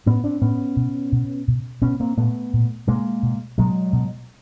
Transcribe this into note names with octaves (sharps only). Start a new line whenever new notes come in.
A2 B3 C#4
C4 D4
A2 B3 C#4
B2
B2
B2
B2 B3 C#4
A#3 C4
A#2 A3 B3
A#2
B2 G#3 A#3
B2
B2 F#3 G#3
B2